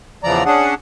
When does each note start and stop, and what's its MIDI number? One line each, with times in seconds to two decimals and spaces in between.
0.24 0.44 40
0.24 0.44 49
0.24 0.44 52
0.24 0.44 53
0.24 0.44 74
0.24 0.44 82
0.46 0.74 61
0.46 0.74 62
0.46 0.74 68
0.46 0.74 78